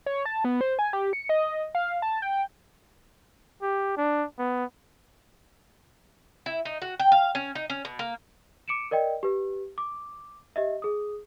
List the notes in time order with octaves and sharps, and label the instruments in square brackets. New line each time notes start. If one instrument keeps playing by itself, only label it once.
[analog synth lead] C#5
A5
B3
C5
G#5
G4
C#7
D#5
F5
A5
G5
[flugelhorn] G4
D4
B3
[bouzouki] E4
D#4
F#4
G5
F5
C#4
D#4
C#4
B2
A#3
[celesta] D6 C#7 D7 E7
A#4 D5 D#5 G5
G4 B4
D6
G4 D#5 E5
G#4 D#6